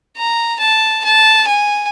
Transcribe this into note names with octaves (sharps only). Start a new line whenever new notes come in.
A#5
A5
A5
G#5